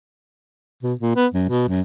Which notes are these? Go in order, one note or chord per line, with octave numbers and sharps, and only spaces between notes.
B2
A#2
B3
F#2
B2
F#2